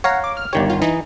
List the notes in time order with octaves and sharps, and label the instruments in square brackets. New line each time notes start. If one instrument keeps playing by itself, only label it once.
[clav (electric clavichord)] C#5 F5 A#5 [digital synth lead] F#5
[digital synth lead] D6
F6
[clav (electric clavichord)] G1 D#3 C#5 [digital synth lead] G4
[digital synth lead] F4
[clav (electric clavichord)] E3 [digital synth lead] D#4